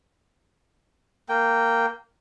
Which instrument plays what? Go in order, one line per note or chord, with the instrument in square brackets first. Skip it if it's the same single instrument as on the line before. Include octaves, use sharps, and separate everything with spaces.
[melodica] A#3 G5